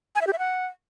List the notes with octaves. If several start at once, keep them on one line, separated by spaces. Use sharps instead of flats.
G#5
E5
G4
E5
F#5